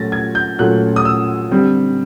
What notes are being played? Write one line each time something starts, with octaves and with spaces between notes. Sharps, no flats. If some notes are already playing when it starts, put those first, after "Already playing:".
Already playing: A#2 F#3 A3 C#4 A6 A#6
G#6
G6
A#2 F#3 A3 C#4 F#6
D#6
E6
D3 G3 C4